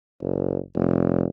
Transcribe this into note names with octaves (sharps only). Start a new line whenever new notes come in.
F#1
F1